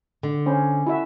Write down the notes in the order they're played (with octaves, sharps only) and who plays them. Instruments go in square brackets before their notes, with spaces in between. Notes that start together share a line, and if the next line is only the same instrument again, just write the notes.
[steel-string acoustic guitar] D3
[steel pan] C#4 C5
E4 F#4 E5